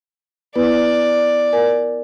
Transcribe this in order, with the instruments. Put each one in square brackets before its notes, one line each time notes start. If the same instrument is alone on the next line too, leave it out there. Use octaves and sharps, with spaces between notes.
[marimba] B3 E4 B4 [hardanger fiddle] D5
[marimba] A#4 G#5